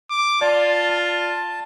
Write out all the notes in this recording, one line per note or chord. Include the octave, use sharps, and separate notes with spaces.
D6
F4 D5 A5
A5